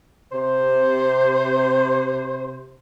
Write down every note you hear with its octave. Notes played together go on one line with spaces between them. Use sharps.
C3 C5